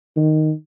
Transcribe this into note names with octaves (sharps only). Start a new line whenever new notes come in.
D#3